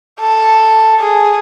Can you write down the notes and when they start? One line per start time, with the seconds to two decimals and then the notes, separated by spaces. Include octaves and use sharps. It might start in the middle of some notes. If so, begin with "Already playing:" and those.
0.19 A4
1.00 G#4